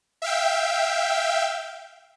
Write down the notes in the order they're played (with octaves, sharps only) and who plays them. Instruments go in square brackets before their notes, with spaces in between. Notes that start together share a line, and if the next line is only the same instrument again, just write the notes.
[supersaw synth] E5 F5 G5